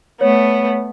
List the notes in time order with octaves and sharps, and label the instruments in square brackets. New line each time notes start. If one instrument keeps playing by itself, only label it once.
[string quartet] A3 B3 [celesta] C#5